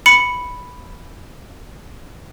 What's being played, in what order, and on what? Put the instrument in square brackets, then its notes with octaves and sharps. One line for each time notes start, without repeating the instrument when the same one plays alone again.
[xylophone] B5 C#7